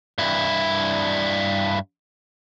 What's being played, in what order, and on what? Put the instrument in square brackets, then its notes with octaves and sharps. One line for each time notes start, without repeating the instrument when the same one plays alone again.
[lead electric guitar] G2 E4